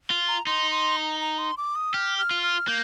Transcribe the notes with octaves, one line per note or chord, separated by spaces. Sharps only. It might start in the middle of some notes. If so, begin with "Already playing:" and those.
F4
A#5
D#4 C6
C6
A#5
A#5
C6
D6
D#6
G4 F6
F6
F4
F6
A#3 G6